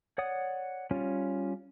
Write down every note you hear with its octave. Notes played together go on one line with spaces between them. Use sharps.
C#5 D5 F#5 D#6
G3 C#4 F4